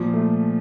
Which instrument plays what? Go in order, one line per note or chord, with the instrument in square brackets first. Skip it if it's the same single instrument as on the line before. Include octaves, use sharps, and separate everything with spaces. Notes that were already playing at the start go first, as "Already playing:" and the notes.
Already playing: [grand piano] A#2 F3
A3